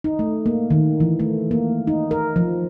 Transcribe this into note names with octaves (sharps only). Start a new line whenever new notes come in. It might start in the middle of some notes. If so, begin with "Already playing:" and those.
D#4
A3
A#3
D#3
E3
A3
A#3
D#4
A#4
F3